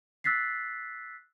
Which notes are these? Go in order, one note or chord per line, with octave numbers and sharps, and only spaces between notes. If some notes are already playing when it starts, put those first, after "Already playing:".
E6 F#6 A6 B6 C7